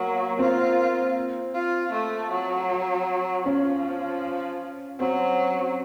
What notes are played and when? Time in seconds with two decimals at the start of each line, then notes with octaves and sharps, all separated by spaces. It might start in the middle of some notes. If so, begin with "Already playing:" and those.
Already playing: F#3 A#3
0.39 C4 F4
1.55 F4
1.93 A3
2.31 F#3
3.46 F3 C#4
4.99 F#3 C4